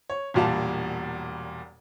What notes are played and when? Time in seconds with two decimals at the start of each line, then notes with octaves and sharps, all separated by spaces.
0.10 C#5
0.34 E1 E2 A#2 G3 F5 A5